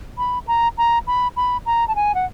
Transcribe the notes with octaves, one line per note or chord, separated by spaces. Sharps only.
B5
A#5
A#5
B5
B5
A#5
A5
G#5
F#5